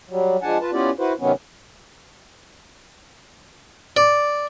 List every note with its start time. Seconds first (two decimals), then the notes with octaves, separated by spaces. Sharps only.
0.10 F#3 G3
0.42 F3 G#3 D4 F#5 G#5 A5
0.61 F4 B4 A5
0.73 B3 C#4 E4 F4 G4 D5
0.99 E4 F#4 B4 C5
1.20 C3 D#3 F#3 B3 C#4
3.97 D5